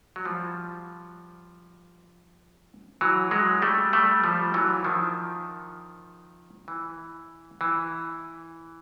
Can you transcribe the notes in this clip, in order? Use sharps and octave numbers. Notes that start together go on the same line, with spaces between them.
F#3
F3 G3
E3 F#3
F#3 G#3
G3 A3
G3 A3
F3 G3
E3 F#3
D#3 F3
E3
E3